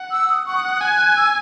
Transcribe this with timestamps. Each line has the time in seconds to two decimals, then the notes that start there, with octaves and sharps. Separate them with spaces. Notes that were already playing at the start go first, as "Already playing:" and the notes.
Already playing: F#5
0.11 E6
0.28 D#6
0.46 F#5 C#6
0.55 D#6
0.63 F#6
0.72 D#6
0.80 G#5 F#6
1.16 E6